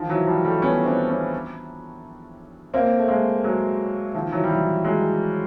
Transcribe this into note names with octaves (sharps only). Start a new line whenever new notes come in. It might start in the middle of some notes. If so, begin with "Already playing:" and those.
Already playing: D#3 F3
E3 F#3
F3 G3
G3 A3
B3 C#4
C4 D4
B3 C#4
A#3 C4
A3
G#3 A#3
F#3 G#3
D#3 F3
E3 F#3
G3
E3 F#3
F#3 G#3